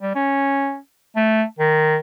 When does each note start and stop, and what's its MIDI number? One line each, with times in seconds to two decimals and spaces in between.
0.01 0.14 55
0.15 0.77 61
1.16 1.43 57
1.59 1.97 51